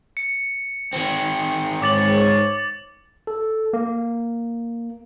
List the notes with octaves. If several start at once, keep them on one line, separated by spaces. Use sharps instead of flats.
C#7
D#3 C4
G#2 C#5 D6 A6 F#7
A4
A#3